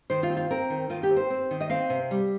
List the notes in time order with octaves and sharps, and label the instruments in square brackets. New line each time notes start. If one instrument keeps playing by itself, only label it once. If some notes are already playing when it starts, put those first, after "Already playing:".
[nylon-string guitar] D#3 C5
F4
C4
F4
C4 A#4
D#3
D#3 F4
G4
C4
C5
C4
D#3
D#5
C4 F5
C3
G3